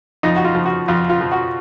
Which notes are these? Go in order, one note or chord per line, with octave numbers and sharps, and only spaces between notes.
F2 D#4
F#4
F4
F3
F#4
F2 F4
F4
F3
F#4